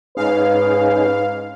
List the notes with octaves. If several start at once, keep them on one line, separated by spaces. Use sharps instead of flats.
G#2 C#4 D#4 G#4 B4 F5